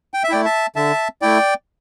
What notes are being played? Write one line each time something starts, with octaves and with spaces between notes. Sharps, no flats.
G5
E5
A3 E4 D5 G5
E5 A5
D3 E5 A5
A3 E4 D5 G5